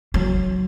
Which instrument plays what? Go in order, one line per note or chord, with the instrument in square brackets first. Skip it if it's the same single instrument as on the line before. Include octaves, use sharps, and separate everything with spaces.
[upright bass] F#3